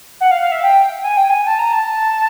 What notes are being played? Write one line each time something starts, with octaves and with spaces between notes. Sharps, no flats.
F#5
F5
F5
E5
G5
G#5
G5
G#5
A5
A#5
A5